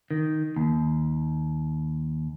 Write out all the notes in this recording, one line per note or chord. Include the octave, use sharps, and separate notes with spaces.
D#3
D#2